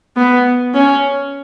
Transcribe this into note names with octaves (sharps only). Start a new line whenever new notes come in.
B3
C#4